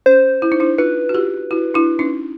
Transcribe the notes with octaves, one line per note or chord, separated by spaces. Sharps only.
C#4 C5
E4
D#4
D4 E4
D#4 F4 B4
F#4
F4 G4
E4 F#4
D4 E4
C#4 D#4